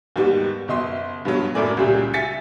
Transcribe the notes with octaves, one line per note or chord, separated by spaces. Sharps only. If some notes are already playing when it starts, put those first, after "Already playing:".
D#2 G#2 G3 B3
F#1 B2 D#5 E5 C6
G2 B2 F#3
F#2 A2 A3 A#4 D5 G#5
C#2 A#2 C#3 G3
E5 G#5 A6 B6 C#7